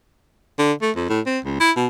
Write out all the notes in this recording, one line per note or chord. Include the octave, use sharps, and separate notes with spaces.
D3
A3
F2
A2
C4
C#2
E4
B2